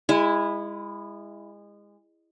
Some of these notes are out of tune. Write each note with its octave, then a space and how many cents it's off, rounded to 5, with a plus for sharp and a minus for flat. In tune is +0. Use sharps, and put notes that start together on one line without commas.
G#3 -25 E4 +5